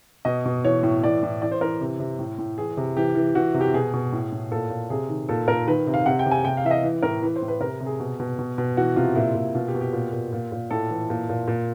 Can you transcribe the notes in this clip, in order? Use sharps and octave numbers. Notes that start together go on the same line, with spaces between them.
B2 D#5
B2
E3 C#5
A2
E3 D5
A2
E3 D5
C5
E3 A#4
C3
C3
A2
A2
E3 G#4
C3
E3 G4
E3
E3 F#4
C3
G4
B2 G#4
B2
A2
A2
A#2 A4
A#2
C3 G#4
D#3
A#2 A4
A#2 A#4
D#3 B4
C3
F5
C3 F#5
G5
C3
G#5
C3 G5
F5
E3 E5
D#5
E3
A2 A#4
E3 B4
C5
A2
B4
C3 A#4
C3
G#4
B2
B2
B2
B2
E3 F#4
C3 F4
A#2 E4
A#2
B2 F4
G4
B2
G4
A#2
A#2
A#2
A#2
A2 A4
E3
A#2
A#2
A#2